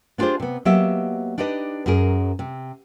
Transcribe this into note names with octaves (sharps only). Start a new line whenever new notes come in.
B3 D4 F4 G4 G#4 C5
C3 B3
F#3 A#3 B3 G4 D#5 E5
D4 D#4 G4 B4 D#5
F#2 F#3 G#4 A#4
C3